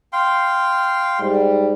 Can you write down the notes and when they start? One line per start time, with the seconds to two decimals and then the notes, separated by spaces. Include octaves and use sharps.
0.13 F5 G5 C6
1.20 G#2 G3